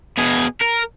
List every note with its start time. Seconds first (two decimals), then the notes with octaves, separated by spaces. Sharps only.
0.18 B2 G#4
0.61 A#4